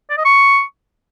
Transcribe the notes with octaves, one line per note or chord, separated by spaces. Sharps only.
D5
D#5
C#6